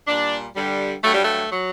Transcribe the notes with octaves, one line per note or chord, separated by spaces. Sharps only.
A#2 G3 D4
G2 D3 G3
G2 F#3 A3
G3
A3
F#3